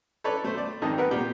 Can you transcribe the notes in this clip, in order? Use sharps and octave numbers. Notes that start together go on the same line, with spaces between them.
A4 B4 C#5 D5
A3 C5
D5
F2 G#2 D#3 D#4 A5
B3 A#4 B4 F#5
A#2 G4 D5